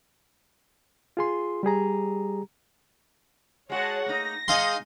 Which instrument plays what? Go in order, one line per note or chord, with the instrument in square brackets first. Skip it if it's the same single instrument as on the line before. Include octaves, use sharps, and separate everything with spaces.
[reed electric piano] F4 G#4 C6
G3 G4 G#4 A#5
[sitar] G#3 F#4 [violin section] C#5 F#5 A5
[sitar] A3 A#3 D#4 [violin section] A#6
[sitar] G#3 D#4 G#4 [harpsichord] D#5 F5 C6